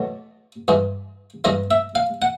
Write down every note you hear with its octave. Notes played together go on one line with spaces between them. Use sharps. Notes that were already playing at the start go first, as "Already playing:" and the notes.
Already playing: E2 B2 F#3 A3
G2 E3 G#3
G2 E3 G#3 D#5
E5
F5
F#5